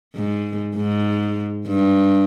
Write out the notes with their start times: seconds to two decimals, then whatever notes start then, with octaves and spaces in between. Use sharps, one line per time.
0.15 G#2
0.76 G#2
1.67 G2